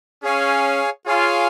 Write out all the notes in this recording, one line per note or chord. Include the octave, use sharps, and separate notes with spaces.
C#4 G#4 C#5 F5 G#5
F4 G#4 C#5 F5 G#5